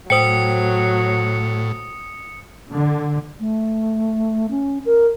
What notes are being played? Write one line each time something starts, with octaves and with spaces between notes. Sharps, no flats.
A2 F#3 C5 G5 D#6 C#7
D3
A3
C#4
A#4